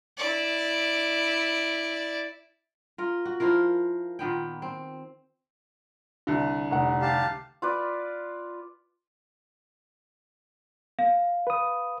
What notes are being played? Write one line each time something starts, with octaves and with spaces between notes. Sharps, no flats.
E4 D5
F4 A#4
F#4
F3 E4 F4 A#4
A#2 D#3 B3 G5
C4
C2 D3
F1 F#5
G4 F5 A5
F4 B4 D5
F5
B4 D#6